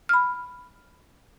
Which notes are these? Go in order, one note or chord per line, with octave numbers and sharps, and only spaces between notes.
B5 F6